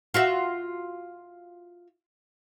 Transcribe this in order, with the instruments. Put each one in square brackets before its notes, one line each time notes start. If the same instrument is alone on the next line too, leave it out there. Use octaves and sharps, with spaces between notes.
[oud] F4 F#4 E5